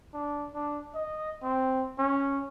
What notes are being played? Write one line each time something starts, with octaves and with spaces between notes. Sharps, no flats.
D4
D4
D#5
C4
C#4